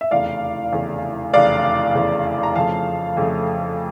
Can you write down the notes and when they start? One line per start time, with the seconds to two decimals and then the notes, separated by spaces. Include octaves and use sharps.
0.01 E5
0.11 F1 E2 C#3 D5 F5
0.72 F1 E2 C#3
1.33 F1 E2 C#3 D5 F5
1.95 F1 E2 C#3
2.43 A#5
2.56 F2 C#3 F3 A3 F5 A5
3.17 F2 C#3 F3 A3